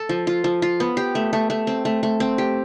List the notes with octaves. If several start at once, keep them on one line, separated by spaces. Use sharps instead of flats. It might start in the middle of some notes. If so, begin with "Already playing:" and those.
Already playing: A4
F3
F4
F3
F4
B3
G4
A3
A3
A3
C4
A3
A3
C4
G4